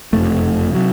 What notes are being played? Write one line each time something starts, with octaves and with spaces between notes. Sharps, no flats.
F#1 F2 C3 A3
C3 F#3